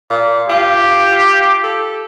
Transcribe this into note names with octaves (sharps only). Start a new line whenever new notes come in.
A#2
F4 G4
F4
A4